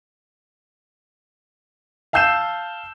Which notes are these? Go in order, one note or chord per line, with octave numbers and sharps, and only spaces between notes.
F5 A5 E6 G6 C7 E7